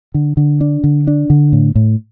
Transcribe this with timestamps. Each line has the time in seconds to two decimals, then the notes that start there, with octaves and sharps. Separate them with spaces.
0.14 D3
0.37 D3
0.61 D4
0.84 D3
1.07 D4
1.30 D3
1.52 A2
1.75 A2